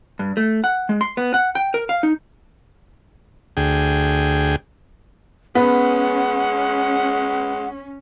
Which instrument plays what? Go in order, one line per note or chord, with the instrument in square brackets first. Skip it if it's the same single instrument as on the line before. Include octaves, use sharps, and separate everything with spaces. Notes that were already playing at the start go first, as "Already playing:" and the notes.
[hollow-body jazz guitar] G2
A3
F#5
G#3
C6
B3
F#5
G5
A#4
F5
D#4
[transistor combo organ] D2 G#4 G5
[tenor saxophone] G#3 [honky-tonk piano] B3 [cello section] C#4 [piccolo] F#5